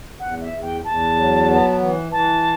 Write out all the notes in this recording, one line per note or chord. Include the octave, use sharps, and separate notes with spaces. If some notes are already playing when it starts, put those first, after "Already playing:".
E2 F#5
E5
E2
G5
E2 A5
F#3
B3
E3
E3 A5